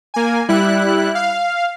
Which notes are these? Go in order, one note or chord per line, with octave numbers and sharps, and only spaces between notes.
A#3 G#5
G3 E4 F#6
F5